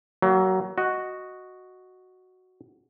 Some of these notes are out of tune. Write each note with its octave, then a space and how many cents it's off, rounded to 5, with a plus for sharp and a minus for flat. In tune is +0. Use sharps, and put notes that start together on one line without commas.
F#3 +25 A#3 +0
F#4 +0 D#5 +0